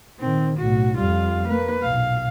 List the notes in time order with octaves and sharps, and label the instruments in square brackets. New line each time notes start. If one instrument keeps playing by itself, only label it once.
[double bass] A#2 D#3 [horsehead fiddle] C4
[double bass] B1 A2 [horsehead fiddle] F#4
[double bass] F2 G3 [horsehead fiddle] F4 F5
[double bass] A#3 [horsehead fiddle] B4
[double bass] B1 A#2 [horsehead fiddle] F5